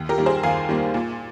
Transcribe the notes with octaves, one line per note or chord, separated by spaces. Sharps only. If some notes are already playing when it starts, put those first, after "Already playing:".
Already playing: D#2
G4 A#4
D#3 G3 A#3
G#4 C5
D#2 F5 G#5
D#3 G3 A#3
A#2